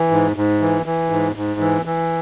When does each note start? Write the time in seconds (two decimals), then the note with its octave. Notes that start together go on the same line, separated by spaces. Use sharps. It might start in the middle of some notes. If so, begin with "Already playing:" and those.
Already playing: E3
0.10 G#2
0.36 G#2
0.61 E3
0.86 E3
1.10 G#2
1.36 G#2
1.60 E3
1.85 E3